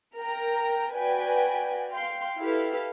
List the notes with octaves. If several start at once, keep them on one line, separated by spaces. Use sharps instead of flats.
A#4 G5 A#5
F#4 B4 D5 G5 G#5
F5 G5 C6
E4 G4 A4 B4 F5